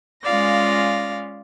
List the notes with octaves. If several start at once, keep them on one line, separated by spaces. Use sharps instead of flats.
G#3 C#4 F4 D5 F5 A#6